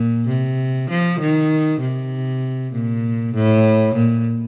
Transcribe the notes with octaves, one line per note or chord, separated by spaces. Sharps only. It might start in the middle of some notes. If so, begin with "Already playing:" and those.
Already playing: A#2
C3
F3
D#3
C3
A#2
A2
A#2